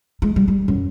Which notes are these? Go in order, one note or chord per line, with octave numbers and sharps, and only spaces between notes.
G#3
G3
G3
F#2